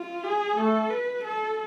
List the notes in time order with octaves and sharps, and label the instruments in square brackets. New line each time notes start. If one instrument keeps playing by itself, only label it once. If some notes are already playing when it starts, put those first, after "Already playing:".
Already playing: [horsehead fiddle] F4
G#4
[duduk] A3 [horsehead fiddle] A4
[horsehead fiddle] B4
A4